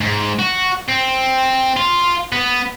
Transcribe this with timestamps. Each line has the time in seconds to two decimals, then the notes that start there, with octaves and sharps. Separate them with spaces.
0.01 G#2
0.39 F#4
0.89 C4
1.77 F4
2.33 B3